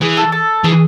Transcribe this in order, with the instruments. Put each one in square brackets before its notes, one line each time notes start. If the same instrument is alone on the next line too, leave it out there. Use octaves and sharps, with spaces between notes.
[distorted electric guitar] E3 [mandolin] G#4
[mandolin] A4
A4
[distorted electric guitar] E3 [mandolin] G#4